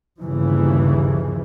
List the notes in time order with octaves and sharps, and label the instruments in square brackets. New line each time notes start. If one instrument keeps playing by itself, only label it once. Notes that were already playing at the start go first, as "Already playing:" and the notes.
[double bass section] G1 D#2 C#3 E3 F3